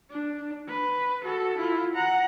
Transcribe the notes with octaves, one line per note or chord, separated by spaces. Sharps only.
D4
B4
F#4 A4
E4 F4
F#5 A#5